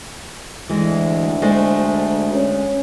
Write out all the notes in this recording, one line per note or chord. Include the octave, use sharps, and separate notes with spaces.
D2 E3 G#3
G#3 A3 C5
C#4